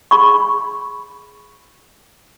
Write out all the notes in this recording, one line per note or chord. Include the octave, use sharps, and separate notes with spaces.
G#4 B5 C#6